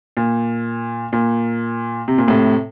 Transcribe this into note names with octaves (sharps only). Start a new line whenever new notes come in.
A#2
A#2
C3
A#2
A2 C3